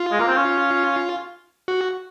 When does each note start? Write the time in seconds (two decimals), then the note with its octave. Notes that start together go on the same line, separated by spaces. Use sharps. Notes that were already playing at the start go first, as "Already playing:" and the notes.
Already playing: F4
0.12 G#3
0.20 A#3
0.28 C4
0.36 C#4
1.68 F#4